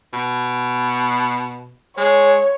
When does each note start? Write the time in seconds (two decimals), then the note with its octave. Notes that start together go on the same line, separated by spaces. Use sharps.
0.13 B2
1.98 G#3 C#5